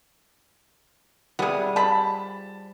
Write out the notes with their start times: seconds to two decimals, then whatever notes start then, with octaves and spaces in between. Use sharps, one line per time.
1.39 C3 G3 B3 G#4
1.76 F3 A5 B5